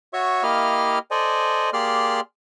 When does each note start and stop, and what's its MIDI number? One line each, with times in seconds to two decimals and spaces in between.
0.13 0.43 66
0.13 0.43 73
0.13 0.43 76
0.13 0.43 85
0.43 0.99 58
0.43 0.99 64
0.43 0.99 67
0.43 0.99 75
0.43 0.99 77
0.43 0.99 89
1.11 1.70 69
1.11 1.70 72
1.11 1.70 74
1.11 1.70 75
1.11 1.70 80
1.73 2.20 58
1.73 2.20 67
1.73 2.20 68
1.73 2.20 74
1.73 2.20 84
1.73 2.20 89